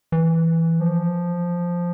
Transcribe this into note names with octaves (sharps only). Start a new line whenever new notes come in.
E3
F3